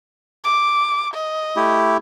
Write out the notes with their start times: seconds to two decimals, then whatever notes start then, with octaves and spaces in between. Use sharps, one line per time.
0.44 D6
1.14 D#5
1.56 A3 E4 G4